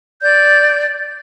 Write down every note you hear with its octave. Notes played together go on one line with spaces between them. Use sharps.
D5 G6